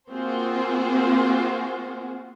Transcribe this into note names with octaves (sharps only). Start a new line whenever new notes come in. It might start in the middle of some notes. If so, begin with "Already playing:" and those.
A#3 C4 F4 F#4 G#4 C5